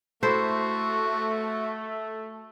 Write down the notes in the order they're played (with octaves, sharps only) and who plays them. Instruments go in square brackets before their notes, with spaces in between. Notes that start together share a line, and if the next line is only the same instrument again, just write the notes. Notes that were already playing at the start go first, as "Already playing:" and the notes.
[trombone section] A3 [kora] E4 A4 C5 [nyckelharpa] F#4